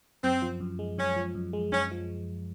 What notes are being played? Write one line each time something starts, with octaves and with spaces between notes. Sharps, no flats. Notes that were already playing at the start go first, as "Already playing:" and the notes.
F#2 C4
F3
F#2
G#3
F#2 C#4
F3
F#2
G#3
F#2 C#4
F3